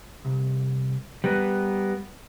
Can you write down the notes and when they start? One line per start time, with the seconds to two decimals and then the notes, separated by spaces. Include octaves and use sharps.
0.25 C2
1.24 G3 B3 A#4 B4